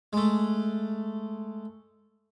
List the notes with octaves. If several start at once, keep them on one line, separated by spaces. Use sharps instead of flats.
G#3 A3